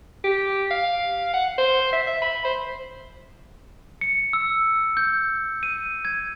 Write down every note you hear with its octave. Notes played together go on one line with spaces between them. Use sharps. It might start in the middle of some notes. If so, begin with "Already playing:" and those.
G4
F5
F#5
C5
E5
E5
B5
C5
C#7
E6
G6
D#7
G#6